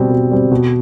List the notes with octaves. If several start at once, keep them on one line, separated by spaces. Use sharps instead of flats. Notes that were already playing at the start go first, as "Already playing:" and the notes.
Already playing: B2 G3 C4
B2
G3 C4
B2